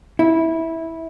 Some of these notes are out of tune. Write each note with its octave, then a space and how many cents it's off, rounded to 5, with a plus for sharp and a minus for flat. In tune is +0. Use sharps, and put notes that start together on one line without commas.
E4 -15